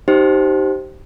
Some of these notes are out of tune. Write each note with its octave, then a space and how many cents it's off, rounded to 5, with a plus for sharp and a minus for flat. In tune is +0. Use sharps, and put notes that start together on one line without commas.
D#4 +0 G4 -20 C5 +0